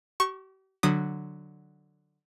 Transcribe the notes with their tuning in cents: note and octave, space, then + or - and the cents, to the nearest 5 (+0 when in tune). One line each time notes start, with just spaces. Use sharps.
G4 -45 C#6 -10
D3 +10 F#3 +0 D#6 -20